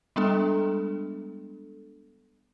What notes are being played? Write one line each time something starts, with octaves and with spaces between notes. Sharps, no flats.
G3 G#3 B3 D4 A4